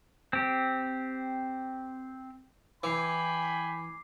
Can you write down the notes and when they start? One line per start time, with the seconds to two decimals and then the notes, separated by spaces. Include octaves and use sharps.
0.33 C4 G4
2.83 E3 G5 G#5 B5 D6 C7